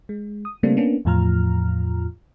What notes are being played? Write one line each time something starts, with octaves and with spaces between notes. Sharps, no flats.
G#3
D#6
C#3 G3 A3 A#3 C4 D4
A#3 B3 C#4 D4
E2 A2 F3 F4 A#5 F6